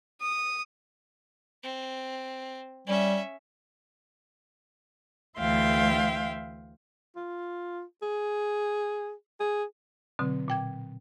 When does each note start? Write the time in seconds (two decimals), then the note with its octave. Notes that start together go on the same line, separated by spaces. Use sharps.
0.20 D#6
1.64 C4
2.87 G3 C#4 E5
5.38 D2 E3 E5 F5 G5 C6
7.16 F4
8.02 G#4
9.40 G#4
10.19 B2 D3 F#3 C4
10.48 A#2 G5 G#6